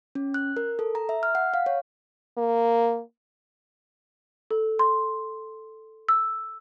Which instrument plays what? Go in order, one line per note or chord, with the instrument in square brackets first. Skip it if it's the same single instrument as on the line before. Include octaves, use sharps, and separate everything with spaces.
[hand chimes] C#4
F#6
A#4
A4
A#5
E5
F6
F#5
F5
C#5
[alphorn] A#3
[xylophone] A4
C6
E6